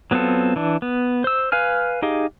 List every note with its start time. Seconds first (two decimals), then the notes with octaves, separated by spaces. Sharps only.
0.11 F#3 B3 C4 F4 A4
0.56 E3 D4
0.82 B3
1.24 C5 E6
1.52 B4 F5 G#5 F6
2.02 D#4 G4 G#4 D#5 F5